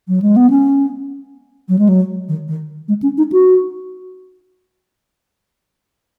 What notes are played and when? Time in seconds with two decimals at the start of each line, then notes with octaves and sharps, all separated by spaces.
0.08 F#3
0.22 G#3
0.36 B3
0.50 C#4
1.69 F#3
1.79 G#3
1.89 F#3
2.29 D#3
2.48 D#3
2.88 G#3
3.02 C#4
3.18 D#4
3.32 F#4